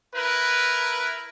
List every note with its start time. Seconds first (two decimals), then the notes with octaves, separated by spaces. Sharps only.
0.13 E4 A#4 B4